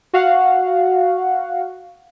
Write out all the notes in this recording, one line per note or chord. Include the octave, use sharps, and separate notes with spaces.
F#4 F5 F#5